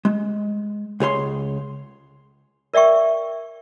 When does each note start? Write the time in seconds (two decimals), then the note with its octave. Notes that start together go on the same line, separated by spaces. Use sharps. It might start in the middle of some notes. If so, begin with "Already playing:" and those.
0.05 G#3
1.00 C#2 G#4 C#5 C6
2.74 A#4 D5 E5 G5 C#6